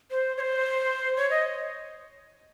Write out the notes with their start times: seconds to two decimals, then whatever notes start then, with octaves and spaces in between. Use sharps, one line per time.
0.11 C5
0.37 C#5
0.41 C5
1.17 C#5
1.30 D#5